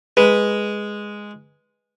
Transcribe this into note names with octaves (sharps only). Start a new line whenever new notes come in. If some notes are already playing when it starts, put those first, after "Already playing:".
G#3 B4